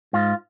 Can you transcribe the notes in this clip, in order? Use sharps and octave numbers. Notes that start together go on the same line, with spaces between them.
G#2 F4